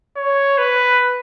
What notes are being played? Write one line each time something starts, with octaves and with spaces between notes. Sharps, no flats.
C#5
B4